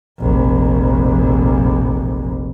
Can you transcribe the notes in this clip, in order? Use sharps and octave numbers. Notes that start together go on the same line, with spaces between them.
F1 A#1